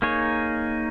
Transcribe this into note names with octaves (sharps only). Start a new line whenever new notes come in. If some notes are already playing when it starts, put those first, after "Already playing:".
A#3 D#4 G#4 C#5